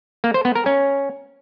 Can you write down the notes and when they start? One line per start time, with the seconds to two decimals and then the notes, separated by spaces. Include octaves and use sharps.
0.24 A#3
0.34 C5
0.45 B3
0.55 A#4
0.66 C#4